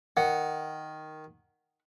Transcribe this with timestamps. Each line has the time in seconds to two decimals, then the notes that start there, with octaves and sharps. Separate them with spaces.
0.17 D#3 F#5